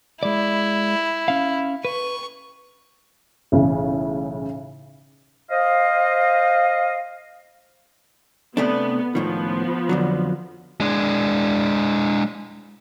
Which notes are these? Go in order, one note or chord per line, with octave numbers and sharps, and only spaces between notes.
G#3 E4 D5
C#4 F5
B4 C#6
B1 A2 C#3 E3
C5 D#5 F5
C3 A3 B3 D4
C#2 A2 D#3 F3 B3
F2 D3 F#3
G#3 D4